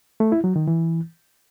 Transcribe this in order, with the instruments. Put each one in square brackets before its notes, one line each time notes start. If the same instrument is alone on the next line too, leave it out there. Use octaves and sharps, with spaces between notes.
[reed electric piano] A3
E4
F#3
D#3
E3